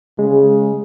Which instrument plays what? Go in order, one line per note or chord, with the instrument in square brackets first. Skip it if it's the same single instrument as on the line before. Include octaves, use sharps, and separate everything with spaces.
[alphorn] C#3 [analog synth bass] G#3